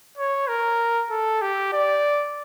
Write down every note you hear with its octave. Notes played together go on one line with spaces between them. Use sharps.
C#5
A#4
A4
G4
D5